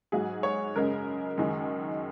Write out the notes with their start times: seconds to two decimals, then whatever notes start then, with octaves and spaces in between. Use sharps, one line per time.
0.12 G#2 F#3 G#4
0.43 C#5
0.76 F#2 C#3 G#3 A#4
1.38 F#2 D#3 G#3